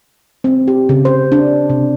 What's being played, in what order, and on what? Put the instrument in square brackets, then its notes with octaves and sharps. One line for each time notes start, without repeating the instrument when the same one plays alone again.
[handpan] C4
G4
C#3
C5
D4
C3